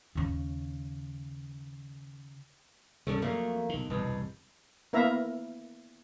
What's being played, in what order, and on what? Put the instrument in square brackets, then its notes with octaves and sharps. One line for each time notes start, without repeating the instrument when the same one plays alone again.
[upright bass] D#2 C#3
[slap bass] C#2 G2 C3 [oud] C#4 A4 D5
[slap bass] F2 F#3 [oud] A3 A#3
[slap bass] B1 D#3
[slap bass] E1 C2 G2 [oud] B2
[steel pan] A#3 B3 E4 E5 F5 A#5